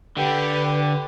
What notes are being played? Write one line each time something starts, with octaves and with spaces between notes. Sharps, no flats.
D3 G4 B4